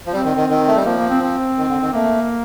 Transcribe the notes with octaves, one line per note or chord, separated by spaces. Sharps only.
F3
G3 C4
D#3
D#3
D#3
A3
G3
F3 A#3
A#3
C4
C4
D#3
D3
D#3
A3 A#3